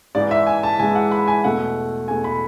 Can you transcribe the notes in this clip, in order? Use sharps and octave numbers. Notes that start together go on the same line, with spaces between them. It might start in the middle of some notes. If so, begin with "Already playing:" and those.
G#2 E3 G#3 D5
E5
G#5
A5
G#2 E3 G#3 G#5
F#5
B5
G#5
E2 B2 A3 F#5
E2 B2 A3 G#5
B5